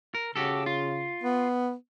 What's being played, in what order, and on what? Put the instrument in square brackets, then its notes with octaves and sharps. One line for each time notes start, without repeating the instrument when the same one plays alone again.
[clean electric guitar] A#4
[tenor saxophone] C#3 [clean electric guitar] F#4 G4 A4
[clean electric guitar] F4
[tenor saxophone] B3